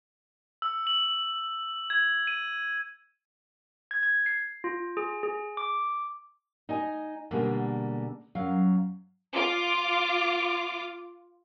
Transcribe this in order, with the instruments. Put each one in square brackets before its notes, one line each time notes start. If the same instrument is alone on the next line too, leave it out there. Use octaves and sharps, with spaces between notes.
[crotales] E6
F#7
G#6
D#7
[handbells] G#6
G#6
C7
F4
G#4
G#4
D6
[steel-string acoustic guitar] D#4 D#5 G#5
B2 D3 G3 G#3 A#3
F#2 F#3 F5
[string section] F4 D6